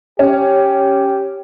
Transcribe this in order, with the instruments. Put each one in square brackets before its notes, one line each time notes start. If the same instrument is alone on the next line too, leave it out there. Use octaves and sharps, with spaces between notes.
[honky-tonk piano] C#4 [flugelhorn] G4